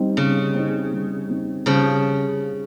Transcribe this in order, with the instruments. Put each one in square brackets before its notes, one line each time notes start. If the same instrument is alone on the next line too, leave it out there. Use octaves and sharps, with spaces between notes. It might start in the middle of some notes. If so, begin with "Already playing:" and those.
Already playing: [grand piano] G3 C4 D#4
[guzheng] C#3 [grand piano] G3
[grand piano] C4 D#4
G3
C4 D#4
[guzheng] C#3 F3 [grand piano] G3